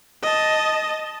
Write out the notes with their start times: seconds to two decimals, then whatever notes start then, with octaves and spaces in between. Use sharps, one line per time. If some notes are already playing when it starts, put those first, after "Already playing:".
0.23 D#5 A5